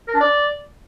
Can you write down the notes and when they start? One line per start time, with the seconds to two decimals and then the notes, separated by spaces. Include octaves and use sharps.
0.08 A#4
0.14 D4
0.20 D5